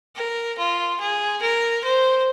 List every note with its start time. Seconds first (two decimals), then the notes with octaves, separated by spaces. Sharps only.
0.16 A#4
0.58 F4
1.00 G#4
1.42 A#4
1.84 C5